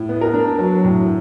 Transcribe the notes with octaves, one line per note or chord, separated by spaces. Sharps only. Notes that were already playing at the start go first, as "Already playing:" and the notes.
Already playing: A2
B3
A#4
D4
F#3
A2